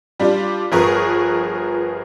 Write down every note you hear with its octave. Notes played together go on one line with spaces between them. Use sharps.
G3 D4 F4
G1 F3 G#4 A#4 B4 C#6